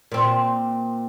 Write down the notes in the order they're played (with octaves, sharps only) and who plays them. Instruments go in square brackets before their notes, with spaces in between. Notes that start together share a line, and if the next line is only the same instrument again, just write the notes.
[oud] A#2 C4